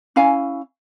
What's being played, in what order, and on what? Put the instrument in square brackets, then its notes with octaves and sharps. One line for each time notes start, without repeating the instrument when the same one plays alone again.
[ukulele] C#4 E4 F5 G#5